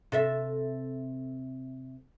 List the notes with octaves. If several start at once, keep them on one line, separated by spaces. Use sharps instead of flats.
C3 A4 E5